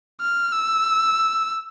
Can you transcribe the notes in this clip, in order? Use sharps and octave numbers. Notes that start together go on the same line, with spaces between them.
F6
E6